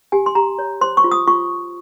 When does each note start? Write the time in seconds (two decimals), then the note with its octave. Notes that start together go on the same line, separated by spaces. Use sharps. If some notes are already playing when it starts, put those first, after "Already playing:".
0.12 G4 G#5
0.26 C6
0.35 G4 A#5
0.59 C#5
0.81 C5 C6
0.97 C#6
1.04 F4
1.11 D#6
1.28 F4 C#6